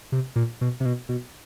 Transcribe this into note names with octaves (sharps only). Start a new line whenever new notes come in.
C3
A#2
B2
C3
B2
B2